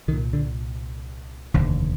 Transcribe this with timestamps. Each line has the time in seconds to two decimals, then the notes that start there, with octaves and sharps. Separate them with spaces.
0.08 C2 D#3
0.13 A#2
0.33 D3
1.54 F1 D#2 D3